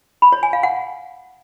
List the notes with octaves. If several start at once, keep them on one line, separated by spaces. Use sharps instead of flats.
B5
C#5
G#5
F5
F#5